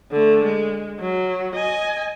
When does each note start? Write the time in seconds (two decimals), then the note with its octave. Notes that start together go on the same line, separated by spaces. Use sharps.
0.12 D3 A3
0.44 G#3
1.00 F#3
1.55 D#5 G#5